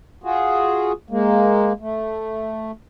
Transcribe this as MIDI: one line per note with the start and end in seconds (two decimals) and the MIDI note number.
0.24 0.92 65
0.24 0.92 66
0.24 0.92 68
1.10 1.73 56
1.10 1.73 58
1.81 2.71 57